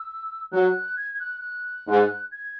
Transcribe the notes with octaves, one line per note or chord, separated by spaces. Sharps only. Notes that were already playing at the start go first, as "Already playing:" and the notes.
Already playing: E6
F#3 F#6
G#6
G#6
F#6
F#6
G#2
G#6